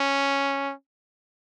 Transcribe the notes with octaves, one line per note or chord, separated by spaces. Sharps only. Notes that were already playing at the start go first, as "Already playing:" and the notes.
Already playing: C#4